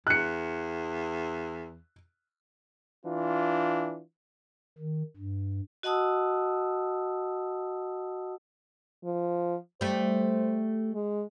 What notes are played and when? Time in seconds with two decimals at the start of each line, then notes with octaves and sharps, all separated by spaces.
0.07 E2 F#6 C#7
3.06 E3 D4 F4
4.78 D#3
5.16 G2
5.83 F#4 D#5 F#5 A5 D#6 E6
9.05 F3
9.81 G3 A3 C5
10.94 G#3